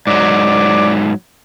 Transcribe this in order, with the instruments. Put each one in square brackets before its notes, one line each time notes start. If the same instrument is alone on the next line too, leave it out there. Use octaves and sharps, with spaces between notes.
[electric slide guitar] G#2 F#3 [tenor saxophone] D5